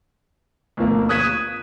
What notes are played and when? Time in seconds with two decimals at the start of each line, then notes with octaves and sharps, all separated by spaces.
0.77 D2 B2 F3 A#3
1.09 D#6 F#6 G#6 B6 D#7 E7